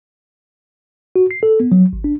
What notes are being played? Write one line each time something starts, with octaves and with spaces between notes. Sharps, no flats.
F#4
C7
A4
B3
F#3
G#1
D4